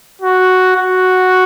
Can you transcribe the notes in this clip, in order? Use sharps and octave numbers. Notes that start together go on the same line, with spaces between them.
F#4
F#4